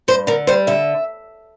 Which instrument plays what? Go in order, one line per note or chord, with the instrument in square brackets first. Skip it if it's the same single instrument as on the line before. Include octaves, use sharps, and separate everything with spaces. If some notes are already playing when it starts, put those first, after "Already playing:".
[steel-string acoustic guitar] G2 C5
D3 A#4
G3 C5
D3 E5